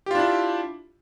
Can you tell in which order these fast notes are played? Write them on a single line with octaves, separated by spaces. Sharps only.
G4 F4 D4 E4